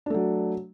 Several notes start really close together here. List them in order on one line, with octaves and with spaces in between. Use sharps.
D4 A3 F#3